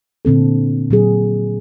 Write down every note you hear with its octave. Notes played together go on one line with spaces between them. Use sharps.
A#2 D3 C4 A4
A#2 F#3 G#4